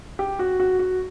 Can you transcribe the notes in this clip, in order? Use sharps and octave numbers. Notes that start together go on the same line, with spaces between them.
G4
F#4
F#4
F#4